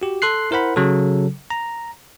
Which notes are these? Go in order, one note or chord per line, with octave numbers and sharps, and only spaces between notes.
F#4 G4
A4 C6 F#6 C7
E4 A#4 C5 F#5 B5
C#3 F#3 A4
A#5